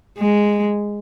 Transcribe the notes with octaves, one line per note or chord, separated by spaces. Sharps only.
G#3